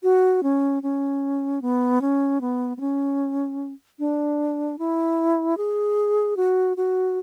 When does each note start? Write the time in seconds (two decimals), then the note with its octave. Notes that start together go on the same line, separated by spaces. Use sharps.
0.03 F#4
0.43 C#4
0.83 C#4
1.62 B3
2.01 C#4
2.41 B3
2.77 B3
2.81 C#4
3.99 D4
4.79 E4
5.57 G#4
6.37 F#4
6.77 F#4